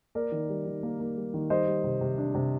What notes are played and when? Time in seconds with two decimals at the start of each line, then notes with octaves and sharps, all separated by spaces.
0.15 A#3 A#4 D5
0.32 D#3
0.49 G3
0.66 D#3
0.83 A#3
1.00 A#3
1.17 G3
1.34 D#3
1.50 G3 C5 D#5
1.67 G3
1.84 C3
2.01 C3
2.18 D4
2.35 C3